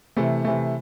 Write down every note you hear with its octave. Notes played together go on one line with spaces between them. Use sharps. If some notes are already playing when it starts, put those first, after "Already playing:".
C3 E3 A3
C3 E3 A3